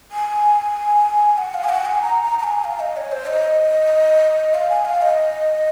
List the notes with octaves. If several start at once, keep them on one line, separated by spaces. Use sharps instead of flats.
G#5
F#5
F5
G#5
F#5
G#5
A#5
A#5
A#5
G#5
F5
D#5
C#5
C5
D#5
F5
G#5
F5
D#5